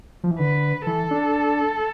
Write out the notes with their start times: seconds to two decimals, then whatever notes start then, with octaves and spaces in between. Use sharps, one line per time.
0.24 F3
0.31 E3
0.39 D3 B4
0.87 E3 A4
1.11 D4